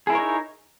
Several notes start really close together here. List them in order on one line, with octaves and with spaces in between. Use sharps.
G#4 E4 A#4 C#5 D#4